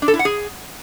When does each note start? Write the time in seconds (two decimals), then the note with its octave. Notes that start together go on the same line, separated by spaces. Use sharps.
0.02 D4
0.08 A4
0.14 E4
0.19 F#5
0.25 G#4